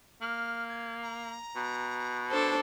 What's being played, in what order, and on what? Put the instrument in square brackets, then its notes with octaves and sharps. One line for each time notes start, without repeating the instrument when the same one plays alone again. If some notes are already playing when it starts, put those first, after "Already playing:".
[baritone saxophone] A#3 [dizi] F6
[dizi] G#6
A#5
[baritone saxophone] B2
[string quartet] D4 A4 C5